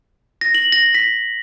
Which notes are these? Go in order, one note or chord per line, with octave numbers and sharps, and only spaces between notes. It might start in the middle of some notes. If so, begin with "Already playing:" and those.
A#6
F#7
A#6
B6